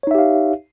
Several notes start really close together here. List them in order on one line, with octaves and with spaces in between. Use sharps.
C#5 D#4 E5 G4 F5